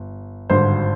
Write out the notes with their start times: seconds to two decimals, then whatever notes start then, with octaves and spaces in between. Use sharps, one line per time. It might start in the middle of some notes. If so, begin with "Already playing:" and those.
Already playing: G1
0.50 G#1 G2 D3 C5